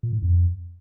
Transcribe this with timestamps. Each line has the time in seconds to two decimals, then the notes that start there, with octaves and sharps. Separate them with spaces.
0.03 A#2
0.13 A2
0.22 F2